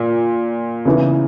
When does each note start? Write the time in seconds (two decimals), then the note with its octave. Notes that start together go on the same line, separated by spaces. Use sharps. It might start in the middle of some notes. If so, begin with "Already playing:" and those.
Already playing: A#2
0.85 C#3 E3 B3 D#4